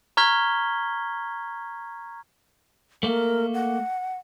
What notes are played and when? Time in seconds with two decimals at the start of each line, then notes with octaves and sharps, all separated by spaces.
0.17 A#5 C#6 F6 G#6 B6 G7
3.03 A3 A#3 A#4
3.54 F#5